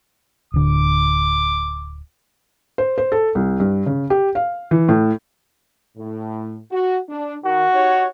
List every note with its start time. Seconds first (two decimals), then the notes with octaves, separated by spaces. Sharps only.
0.54 D1 D3 D6
2.78 C5
2.98 C5
3.12 A4
3.35 C2
3.60 G2
3.86 C#3
4.10 G4
4.35 F5
4.71 E3
4.89 A2
5.97 A2
6.72 F#4
7.09 D4
7.44 D#3 F#4
7.74 D#4 G4 C#5